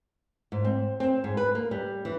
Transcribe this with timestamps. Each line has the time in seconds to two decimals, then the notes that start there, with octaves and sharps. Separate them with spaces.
0.52 G#2
0.65 C4
1.00 C4
1.24 G#2
1.37 B4
1.55 A#3
1.71 G3
2.05 E3